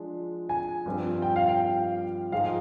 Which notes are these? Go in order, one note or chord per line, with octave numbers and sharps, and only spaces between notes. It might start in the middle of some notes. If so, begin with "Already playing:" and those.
Already playing: F3 G#3 D4
G#5
G2 F3 C4
G5
F5
G5
G#2 F3 G#3 D#4 F5